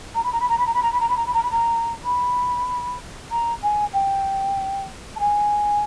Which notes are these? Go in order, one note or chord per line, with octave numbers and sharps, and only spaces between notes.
A#5
B5
A#5
B5
A#5
B5
A#5
B5
A#5
B5
A#5
B5
A#5
B5
A#5
B5
A#5
B5
A#5
G#5
G5
A5
G#5